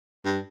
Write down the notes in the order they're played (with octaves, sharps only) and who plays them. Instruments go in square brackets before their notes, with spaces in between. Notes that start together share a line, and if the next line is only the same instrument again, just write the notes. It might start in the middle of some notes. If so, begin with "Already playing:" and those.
[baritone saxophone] G2